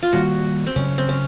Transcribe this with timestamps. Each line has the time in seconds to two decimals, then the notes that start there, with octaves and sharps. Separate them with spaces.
0.03 F4
0.13 D#3 G3 A#3 F#4
0.67 C4
0.76 C#3 F#3 A3 C#4
0.98 C4
1.09 C#4